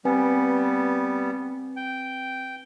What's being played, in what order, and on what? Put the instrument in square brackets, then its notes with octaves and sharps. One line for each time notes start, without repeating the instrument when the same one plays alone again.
[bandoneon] G3 B3 [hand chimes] C4 B4 G#5
[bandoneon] G5